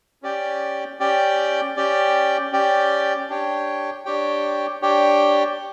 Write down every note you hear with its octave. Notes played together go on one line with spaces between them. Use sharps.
C#4 G4 D5 G5
C#4 G4 D5 G5
C#4 G4 D5 G5
C#4 G4 D5 G5
D4 G4 C#5 G5
D4 G4 C#5 G5
D4 G4 C#5 G5